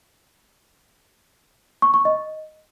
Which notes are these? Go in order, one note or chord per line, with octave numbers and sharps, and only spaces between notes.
C#6
C#6
D#5